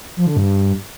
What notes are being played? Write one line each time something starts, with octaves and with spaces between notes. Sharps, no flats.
F3
D3
G2